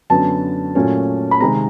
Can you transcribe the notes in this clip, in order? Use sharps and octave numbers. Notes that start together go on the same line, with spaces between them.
F#2 D3 F#3 B3 A5
A#2 F#3 A3 C#4
B5
C3 D#3 G#3 C4 A#5